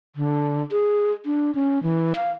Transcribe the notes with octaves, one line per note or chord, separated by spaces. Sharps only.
D3
G#4
D4
C#4
E3
F5